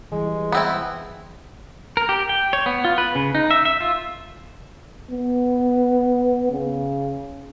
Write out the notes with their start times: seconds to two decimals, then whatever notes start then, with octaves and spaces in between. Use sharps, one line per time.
0.12 E3 G3 G#3
0.52 B3 C4 E4
1.97 A#4
2.09 G4
2.29 G5
2.53 C#5
2.66 B3
2.85 F4
2.98 B4
3.15 C#3
3.35 D#4
3.51 E5
3.65 E5
3.81 F4
5.11 B3
6.51 C#3